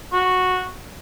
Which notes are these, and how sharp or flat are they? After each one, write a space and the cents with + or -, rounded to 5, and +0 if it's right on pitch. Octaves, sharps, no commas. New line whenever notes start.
F#4 -10